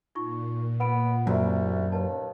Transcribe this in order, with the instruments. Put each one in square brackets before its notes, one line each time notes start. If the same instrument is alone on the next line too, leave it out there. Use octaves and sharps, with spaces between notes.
[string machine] A#2 [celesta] D#4 F4 C#6
[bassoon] B3 [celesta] B4 B5 D7
[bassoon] C2 [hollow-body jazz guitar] F#2 [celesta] F#4 C#5 E5
[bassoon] D#2 [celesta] B4 A5